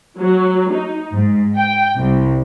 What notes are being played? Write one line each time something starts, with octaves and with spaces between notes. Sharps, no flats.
F#3
D#4
G#2
G5
C2